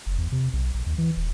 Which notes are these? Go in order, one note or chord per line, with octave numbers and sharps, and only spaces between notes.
F#1
E2
C3
B1
A#1
D#2
E3
D#1